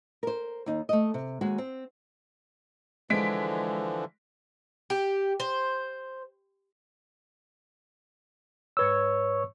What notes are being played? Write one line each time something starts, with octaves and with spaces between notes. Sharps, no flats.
A#4 C5
D#2 D#4
A3 D#5
C3
D#2 G#3 F#4
C4
D3 E3 F3 G#3 B6 D7
G4
C5
G#2 B4 C#5 E6